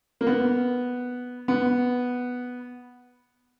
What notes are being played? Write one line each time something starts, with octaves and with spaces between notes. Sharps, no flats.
A#3
B3
B3